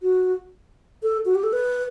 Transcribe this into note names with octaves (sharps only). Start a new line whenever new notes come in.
F#4
A4
F#4
G4
A4
B4